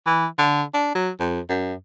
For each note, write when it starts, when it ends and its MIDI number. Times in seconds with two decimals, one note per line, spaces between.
0.06 0.26 52
0.39 0.63 50
0.74 0.91 62
0.95 1.10 54
1.20 1.40 41
1.49 1.74 42